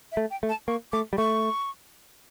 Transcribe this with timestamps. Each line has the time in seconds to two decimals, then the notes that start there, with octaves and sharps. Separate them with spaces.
0.12 E5
0.17 A3
0.31 G5
0.43 A3
0.49 A5
0.68 A#3 C#6
0.92 A3 D6
1.13 G3
1.18 A3 C#6